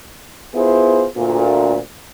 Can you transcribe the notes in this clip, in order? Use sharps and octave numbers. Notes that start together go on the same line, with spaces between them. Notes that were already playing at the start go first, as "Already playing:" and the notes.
B3 E4 F4 G#4 C5
D2 A#2